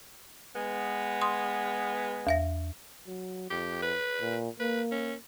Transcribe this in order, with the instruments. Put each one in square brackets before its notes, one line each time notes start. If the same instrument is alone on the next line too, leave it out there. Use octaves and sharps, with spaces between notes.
[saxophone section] G#3 B3
[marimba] C6 D#6
E2 E5 A#6
[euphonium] F#3
[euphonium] F2 [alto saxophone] G4
[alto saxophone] B4
[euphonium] A#2
[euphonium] A#3 [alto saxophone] B4
[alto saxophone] C#4